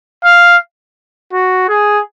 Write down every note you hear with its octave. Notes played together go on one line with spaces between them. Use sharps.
F5
F#4
G#4